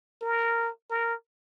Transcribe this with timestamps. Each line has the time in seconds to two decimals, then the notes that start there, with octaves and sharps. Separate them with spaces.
0.22 A#4
0.90 A#4